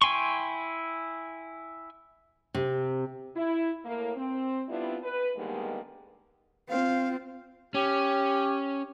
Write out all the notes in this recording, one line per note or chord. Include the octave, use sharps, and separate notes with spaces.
E4 G5 G#5 C6 C#6
C3
E4
A2 A#3
C4
G3 B3 C4 D4 E4 F4
B4
D3 D#3 G3 G#3 A#3 B3
C4 F4 F5
C#4 G4